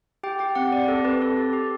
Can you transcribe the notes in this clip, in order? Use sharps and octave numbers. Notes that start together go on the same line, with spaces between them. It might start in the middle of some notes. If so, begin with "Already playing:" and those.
G4 G5
G4 G5
C4 F#5
G4 D5
C4 A4
C4 B4
C4 A4
G4
G4